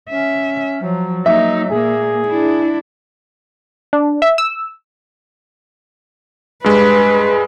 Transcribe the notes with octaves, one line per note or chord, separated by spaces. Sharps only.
C#4 E5
F3 F#3
A#3 D#4 E5
A#2 A#3 G#4
D4 E4
D4
E5
E6
G2 G#3 B4